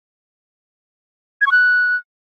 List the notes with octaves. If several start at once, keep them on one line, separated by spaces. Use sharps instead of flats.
G#6
C#6
F#6